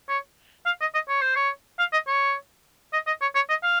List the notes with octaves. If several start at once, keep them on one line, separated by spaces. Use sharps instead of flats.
C#5
F5
D#5
D#5
C#5
C5
C#5
F5
D#5
C#5
D#5
D#5
C#5
C#5
D#5
F5